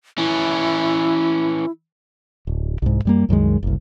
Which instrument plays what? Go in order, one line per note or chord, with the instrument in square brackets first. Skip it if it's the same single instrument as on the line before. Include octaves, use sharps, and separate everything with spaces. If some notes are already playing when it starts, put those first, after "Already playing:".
[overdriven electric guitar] E3 C#4 [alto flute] E4
[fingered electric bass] D1
C2 G#2
F#2 G3 A#3
C2 F#2 D#3 G#3
F#1 C2